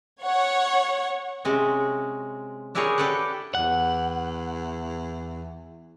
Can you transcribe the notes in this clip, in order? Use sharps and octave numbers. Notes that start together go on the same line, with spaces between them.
C#5 F#5 C#6
C3 G#3 C#4 F#4
D4 E4 G4 G#4 A#4 C#5
G4 A4 B4 D5 F#5
E2 F#5